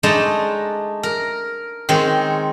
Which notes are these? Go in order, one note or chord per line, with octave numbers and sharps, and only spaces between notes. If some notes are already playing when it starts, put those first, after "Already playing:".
G#3 A3 D4 D#4 A5 A#5
A#4
D#3 G#3 C4 C#5